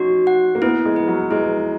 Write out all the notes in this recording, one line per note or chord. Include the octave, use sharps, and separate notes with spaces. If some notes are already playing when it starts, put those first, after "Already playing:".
Already playing: C#4 D#4 F#4
F#5
A#3
B3 E4
G#3
B4
F#3
G#3 E4